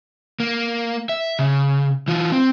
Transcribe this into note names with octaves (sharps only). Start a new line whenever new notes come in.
A#3
E5
C#3
E3 F4
C4